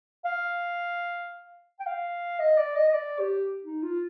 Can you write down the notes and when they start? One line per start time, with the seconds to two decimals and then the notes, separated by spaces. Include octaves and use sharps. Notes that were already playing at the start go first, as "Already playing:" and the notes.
0.25 F5
1.80 G5
1.86 F5
2.40 D#5
2.58 D5
2.76 D#5
2.88 D#5
2.93 D5
3.19 G4
3.64 D#4
3.83 F4